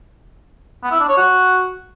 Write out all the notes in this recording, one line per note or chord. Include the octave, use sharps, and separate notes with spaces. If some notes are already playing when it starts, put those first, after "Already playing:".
B3
E4
D4
C#5
F#4